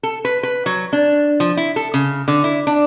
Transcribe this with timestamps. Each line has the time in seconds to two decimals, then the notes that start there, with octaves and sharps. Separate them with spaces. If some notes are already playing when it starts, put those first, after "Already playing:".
0.03 A4
0.25 B4
0.43 B4
0.66 F#3
0.93 D4
1.40 F3
1.57 E4
1.76 A4
1.94 C#3
2.28 D3
2.44 E4
2.67 D4